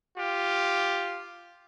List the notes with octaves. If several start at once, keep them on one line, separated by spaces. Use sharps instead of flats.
F4 G4